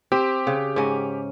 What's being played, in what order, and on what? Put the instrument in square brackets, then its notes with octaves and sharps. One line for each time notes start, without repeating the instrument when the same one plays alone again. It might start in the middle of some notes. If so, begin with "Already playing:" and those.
[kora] C4 [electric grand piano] G4
[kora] C#3
G#2 C#4